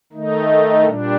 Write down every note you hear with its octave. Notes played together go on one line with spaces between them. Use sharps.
D#3 A3 D#4
A#2 G3 D4